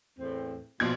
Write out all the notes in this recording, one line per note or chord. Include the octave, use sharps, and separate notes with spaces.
E2 A2 C4
A#1 B2 F3 G#6